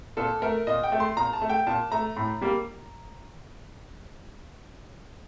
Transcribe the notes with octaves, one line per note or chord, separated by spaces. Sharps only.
A#2 A4
A3 A#4
A#2 D#5
G5
A3
C6
A#2 A#5
A5
A3
G5
A#2 A5
A3 A#5
A2
G3 A#3